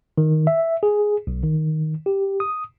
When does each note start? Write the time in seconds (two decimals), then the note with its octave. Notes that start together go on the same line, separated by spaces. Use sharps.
0.18 D#3
0.47 E5
0.83 G#4
1.27 B1
1.43 D#3
2.06 G4
2.40 D#6